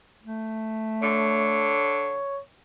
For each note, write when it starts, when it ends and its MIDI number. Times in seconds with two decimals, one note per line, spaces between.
0.23 1.78 57
1.02 2.21 50
1.02 2.40 73